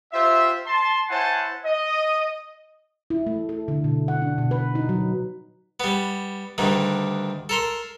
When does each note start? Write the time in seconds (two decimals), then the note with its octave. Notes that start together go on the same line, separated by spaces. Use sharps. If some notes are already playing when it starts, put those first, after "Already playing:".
0.13 F4 G4 C5 E5
0.66 A5 C6
1.09 E4 C5 C#5 F#5 G#5 A5
1.65 D#5
3.10 E4
3.26 A3
3.49 A4
3.68 D3
3.84 B2
4.08 F#5
4.22 D4
4.38 B2
4.51 B4
4.75 D#4
4.89 F#3
5.80 G3 B3
6.58 D2 G2 D#3
7.49 A4 A#4 C6